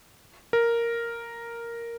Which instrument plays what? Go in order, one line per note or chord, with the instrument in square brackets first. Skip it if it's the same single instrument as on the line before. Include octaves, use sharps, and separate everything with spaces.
[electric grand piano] A#4